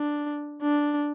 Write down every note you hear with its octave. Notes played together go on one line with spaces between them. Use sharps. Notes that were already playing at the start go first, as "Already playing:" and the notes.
Already playing: D4
D4